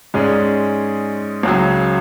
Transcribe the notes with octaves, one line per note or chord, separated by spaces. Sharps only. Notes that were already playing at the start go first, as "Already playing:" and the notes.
G#2 G#3 C#4 G#4 D5
C#2 C#3 F#3